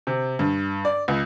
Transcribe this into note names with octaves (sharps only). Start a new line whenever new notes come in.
C3
G2
D5
C#2